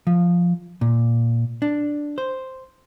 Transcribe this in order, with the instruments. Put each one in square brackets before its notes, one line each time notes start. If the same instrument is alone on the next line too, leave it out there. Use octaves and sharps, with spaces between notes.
[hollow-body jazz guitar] F3
A#2
D4
C5